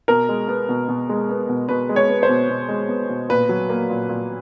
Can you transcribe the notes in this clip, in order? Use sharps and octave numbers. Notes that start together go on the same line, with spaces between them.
B2 A#4
G#3
B3
B2
B2
G#3
B3
B2
B2 B4
G#3
C#5
B3
C5
B2
B2
G#3
B3
B2
A#2 B4
F#3
A#3
A#2
A#2